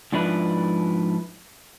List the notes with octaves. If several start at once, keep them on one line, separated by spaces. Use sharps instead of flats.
G#2 F3 D4 E4 B4